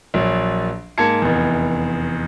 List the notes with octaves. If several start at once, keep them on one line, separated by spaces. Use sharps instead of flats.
A#1 F#3
G#2 A#3 A5 G#6 C#7
F1 E2